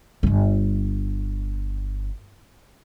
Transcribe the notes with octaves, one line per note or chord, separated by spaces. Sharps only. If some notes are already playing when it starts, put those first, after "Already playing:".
D1 G1